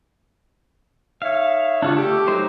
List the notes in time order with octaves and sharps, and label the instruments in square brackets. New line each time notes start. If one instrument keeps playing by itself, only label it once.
[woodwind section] D#4 C#5 E5 [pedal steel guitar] F5
[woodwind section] C#3 [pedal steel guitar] D4 F4 F#4
[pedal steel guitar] A3 A4 [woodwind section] G4
[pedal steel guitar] F#3 D#4 C5